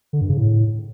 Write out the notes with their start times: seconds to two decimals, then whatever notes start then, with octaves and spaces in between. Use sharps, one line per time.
0.13 D3
0.21 G2
0.29 C#3
0.37 A2